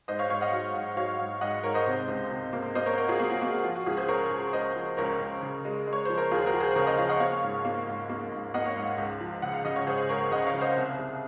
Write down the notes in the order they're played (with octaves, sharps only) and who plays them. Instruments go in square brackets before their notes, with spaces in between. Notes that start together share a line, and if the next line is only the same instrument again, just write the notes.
[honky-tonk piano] G#2 C5 D#5
C#5 F5
G#2 C#5 F5
D#5 F#5
F#3
G#2
F#3 C#5 F5
G#2
G#2 D#5 F#5
G#2 A#4 C#5
C5 D#5
C3
C#2
C3
A#3
A#3 C5 D#5
A#4 C#5
F#3 F#4 A#4
F4 G#4
A#3 F#4
F4
A#3 F#4
F#4
F3 F4
F#4
C#2 F4 G#4
G#4 C5
C#2 A#4 C#5
C#2
C#2 C5 D#5
F3
C#2 A#4 C#5
C#2
C#3
G#3
G#3
C#5
F3 C5
A#4
D#2 F4 G#4
F#4 A#4
F3
G#4 C5
C#3 A#4 C#5
F5
C5 D#5
F3 C#5 F5
D#5 F#5
A#3 C#5 F5
G#2
A#3
G#2
A#3
G#2
A#3 D#5 F#5
C#5 F5
G#2
C#2
F3
C#3 F#5
F5
C#3 D#5
C#5
C#3 G#4 C5
C#2 A#4 C#5
C#3 D#5 F#5
C#5 F5
C#3
C5 D#5
C2
C2